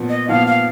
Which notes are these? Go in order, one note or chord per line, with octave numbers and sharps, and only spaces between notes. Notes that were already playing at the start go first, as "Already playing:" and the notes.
Already playing: A#2 F3 B3
D#5
A#2 F3 B3 F5
F5